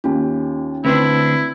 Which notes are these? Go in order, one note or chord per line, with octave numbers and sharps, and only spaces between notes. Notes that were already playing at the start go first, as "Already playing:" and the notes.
D#2 D#3 C#4 F4 G#5
D2 C4 D4 E4 B4